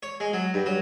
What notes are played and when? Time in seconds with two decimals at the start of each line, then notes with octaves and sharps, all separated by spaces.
0.03 C#5
0.20 G#3
0.33 F#3
0.54 G2
0.66 F#3